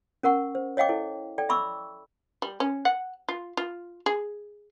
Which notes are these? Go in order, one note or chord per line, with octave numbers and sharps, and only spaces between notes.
C#4 A#4 F#5 C#6
C5
C#5 D#5 F5 G5 D6
E4 A4
A4 D5 G5
E5 B5 C#6 D6 E6
G3
C#4
F#5
F4
F4
G#4